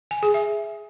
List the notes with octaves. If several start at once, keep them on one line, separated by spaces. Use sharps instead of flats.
G#5
G#4
E5